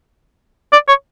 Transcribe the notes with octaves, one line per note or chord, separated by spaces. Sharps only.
D5
C#5